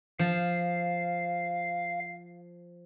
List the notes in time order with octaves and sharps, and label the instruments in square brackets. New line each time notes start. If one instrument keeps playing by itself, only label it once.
[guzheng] F3 [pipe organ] F5